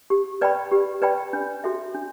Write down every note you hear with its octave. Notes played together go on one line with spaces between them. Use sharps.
G4
B4 D5 G5 B5
G4
B4 D5 G5 B5
D4
F#4 A4 E5
D4